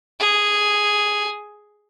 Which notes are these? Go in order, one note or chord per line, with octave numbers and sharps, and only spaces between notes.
G#4